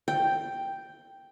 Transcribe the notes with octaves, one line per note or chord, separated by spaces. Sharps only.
G5